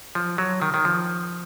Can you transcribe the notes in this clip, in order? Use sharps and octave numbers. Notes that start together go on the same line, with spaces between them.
F3
F#3
D#3
D#3
F3